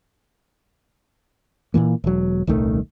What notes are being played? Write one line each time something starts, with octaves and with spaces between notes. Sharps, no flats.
A#2 C#3 E3 A#3
E1 F#3
D#1 C2 D#3 A3